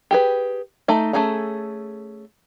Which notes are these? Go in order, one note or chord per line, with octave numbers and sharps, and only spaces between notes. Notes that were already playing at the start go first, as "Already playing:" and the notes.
G4 G#4 B4
A3 D#4
A3 C#4 G#4 A4 A#5